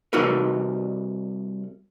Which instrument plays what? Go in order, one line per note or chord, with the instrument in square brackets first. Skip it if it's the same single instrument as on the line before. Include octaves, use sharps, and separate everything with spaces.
[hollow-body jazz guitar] C2 D#4 F#4 A#4 B4